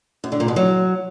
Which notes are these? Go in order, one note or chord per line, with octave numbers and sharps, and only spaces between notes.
F#2
D3
A#2
B2
F#3